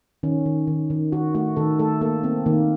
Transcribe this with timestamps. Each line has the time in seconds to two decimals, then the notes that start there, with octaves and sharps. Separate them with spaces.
0.23 D#3 C#4
0.46 D#3
0.67 D#3
0.90 D#3
1.12 D#3 F#4
1.35 A3 F#4
1.56 D#3 A4
1.79 A3 A4
2.01 A#3 A4
2.23 A#3 C4
2.46 D#3 A#3